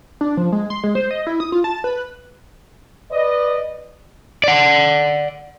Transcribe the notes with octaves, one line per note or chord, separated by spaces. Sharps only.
D4
F3
G#3
C6
G#3
C5
D#5
E4
D#6
F4
A5
B4
B4 D5 D#5
D5 F#5